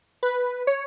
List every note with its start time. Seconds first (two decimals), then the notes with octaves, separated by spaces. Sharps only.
0.23 B4
0.67 C#5